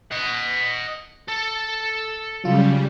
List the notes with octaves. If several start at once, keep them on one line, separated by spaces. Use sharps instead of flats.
D#5 F#5
A4
C#3 F#3 G3 F4